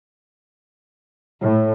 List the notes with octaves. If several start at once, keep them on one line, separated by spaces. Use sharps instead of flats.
A2